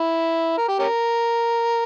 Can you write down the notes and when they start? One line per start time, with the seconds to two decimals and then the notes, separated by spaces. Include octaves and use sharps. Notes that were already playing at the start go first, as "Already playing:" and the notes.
Already playing: E4
0.58 A#4
0.68 G4
0.79 C#4 G4 A#4